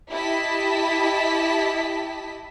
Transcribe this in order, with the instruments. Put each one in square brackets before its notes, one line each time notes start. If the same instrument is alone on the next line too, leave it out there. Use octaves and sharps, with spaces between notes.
[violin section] E4 G4 D#5 A5 B6